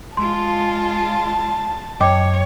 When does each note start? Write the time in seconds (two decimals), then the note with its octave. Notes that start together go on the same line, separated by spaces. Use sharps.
0.17 G#3 F4 A5 C6
2.01 F#2 C#5 D#5 G5 D6